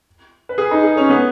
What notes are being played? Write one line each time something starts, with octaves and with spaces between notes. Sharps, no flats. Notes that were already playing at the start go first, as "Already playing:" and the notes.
B4
G#4
D#4
G#4
C#4
B3